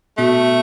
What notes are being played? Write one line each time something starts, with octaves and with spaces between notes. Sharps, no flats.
B2 A3